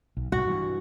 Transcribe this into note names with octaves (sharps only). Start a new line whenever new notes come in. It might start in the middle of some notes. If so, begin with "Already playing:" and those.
B1
B1 G#2 C3 F#4
G2 E3